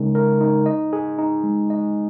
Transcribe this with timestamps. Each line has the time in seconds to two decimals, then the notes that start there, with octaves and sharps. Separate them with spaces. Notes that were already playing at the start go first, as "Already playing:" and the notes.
Already playing: C#3 G#3 D#4 A#4
0.15 A#4
0.41 D#4
0.66 D#5
0.93 G#4
1.19 D#4
1.44 G#3
1.70 D#5